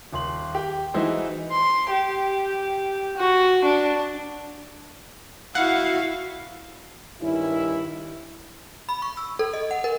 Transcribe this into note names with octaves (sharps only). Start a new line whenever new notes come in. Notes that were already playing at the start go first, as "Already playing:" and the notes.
D#1 C6 F#7
G4
E3 G#3 D#4 E4 F#4 C5
C6
G4
F#4
D4
E4 F#4 F5 F#5
G2 D#3 G3 C#4 E4
B5
C#6
E6
A4
D#5
F#5
A#4